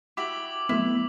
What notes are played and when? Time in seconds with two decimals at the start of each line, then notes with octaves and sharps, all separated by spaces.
0.17 E4 F#4 G4 D6 E6 F#7
0.69 F#3 A3 B3 E4